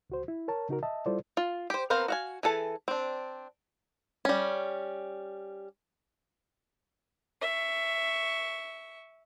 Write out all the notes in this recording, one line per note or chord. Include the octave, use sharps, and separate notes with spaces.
C#2 F#4 C5
E4
A#4 C#5 A5
C#3 D#4 F#4 A#4
D#5 E5 A5
G3 E4 F4 A4 C5 D5
F4
G4 C5
B3 C4 A#4 C5 F5
F#4 F5 G#5
E3 G#4 A4 A5
C4 D4
G3 C#4
E5 C#6